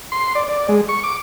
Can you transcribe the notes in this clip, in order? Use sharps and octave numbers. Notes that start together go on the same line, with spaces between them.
C6
D5
D5
G#3
C#6
D6